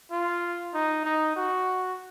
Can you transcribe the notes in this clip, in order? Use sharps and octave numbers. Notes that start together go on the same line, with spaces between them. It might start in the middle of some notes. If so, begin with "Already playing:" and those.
F4
D#4
D#4
F#4